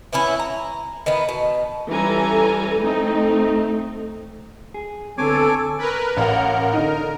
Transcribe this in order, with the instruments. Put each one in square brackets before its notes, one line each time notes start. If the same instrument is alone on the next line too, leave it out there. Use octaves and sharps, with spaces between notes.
[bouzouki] E3 B3 C#4 E4
A#5
D#3 E3 B3
B2
[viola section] E3 G3 C#4 A4 G#5 A#5
A3 C4 D#4
[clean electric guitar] G#4
[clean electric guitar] D3 B3 C4 [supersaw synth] A4 [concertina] C#5 G#5 D6
[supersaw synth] A#4 B4
[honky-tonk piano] A1 F5 F#5 [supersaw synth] A#4
[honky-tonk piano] D3 D#4